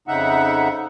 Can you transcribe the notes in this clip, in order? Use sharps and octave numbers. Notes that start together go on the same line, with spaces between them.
F2 C#3 D#4 E5 F#5